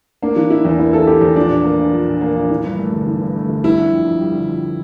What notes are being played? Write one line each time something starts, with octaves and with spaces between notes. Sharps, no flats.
A#3 D4
E3
E4
E2
A#3 E4
E3 A4
E4 G4
E2
F3 D4
A#2
A#3
A#1
F3
A#2
A#3
A#1
E3
G2
A3
G1
E3
G2
A3
G1
G3 E4
D3
F2
F2
G3
D3
F2